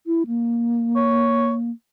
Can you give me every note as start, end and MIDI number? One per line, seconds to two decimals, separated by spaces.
0.07 0.23 64
0.27 1.71 58
0.96 1.53 73